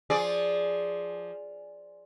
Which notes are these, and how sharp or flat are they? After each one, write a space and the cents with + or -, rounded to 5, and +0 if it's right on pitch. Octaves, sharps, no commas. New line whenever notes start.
F3 +0 G#4 +0 D5 +0